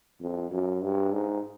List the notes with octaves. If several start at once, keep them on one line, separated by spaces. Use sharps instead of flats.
F2
F#2
G2
G#2